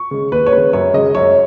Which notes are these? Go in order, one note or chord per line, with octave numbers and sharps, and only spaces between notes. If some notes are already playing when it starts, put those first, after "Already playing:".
Already playing: C#6
C#3 G#3
D#2 B4
C#5
C#3 G#3 B4
F#2 C#5
C#3 G#3 D#5
F#2 C#5